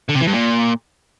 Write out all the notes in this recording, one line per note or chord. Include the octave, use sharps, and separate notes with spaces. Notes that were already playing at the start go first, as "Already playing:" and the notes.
D3
C3
E3
G2
A#2